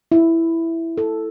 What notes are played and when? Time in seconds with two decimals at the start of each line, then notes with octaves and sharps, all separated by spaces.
0.12 E4
0.98 A4